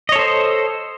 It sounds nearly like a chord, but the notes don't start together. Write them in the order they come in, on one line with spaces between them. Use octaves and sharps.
D#5 C#5 A4 C5